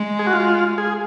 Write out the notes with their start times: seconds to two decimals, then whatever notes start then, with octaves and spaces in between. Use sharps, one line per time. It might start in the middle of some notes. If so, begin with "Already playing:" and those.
Already playing: G#3
0.19 G#4
0.27 F#4
0.33 F4
0.78 G#4